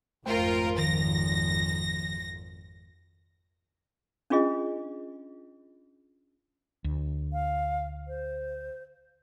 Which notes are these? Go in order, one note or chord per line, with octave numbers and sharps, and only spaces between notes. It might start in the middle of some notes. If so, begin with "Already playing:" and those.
G#1 F2 A3 F4 A#4 C5 G5
D#3 F3 A#6
C#4 D4 F4 G#4 D#5
D2
F5
C5